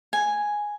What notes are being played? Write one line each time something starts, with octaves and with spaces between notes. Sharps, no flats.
G#5